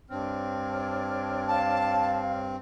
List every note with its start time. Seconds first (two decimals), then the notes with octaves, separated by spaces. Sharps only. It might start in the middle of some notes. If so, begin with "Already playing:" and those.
0.10 G2 C4 D4 C#5 F6
1.48 F5 A5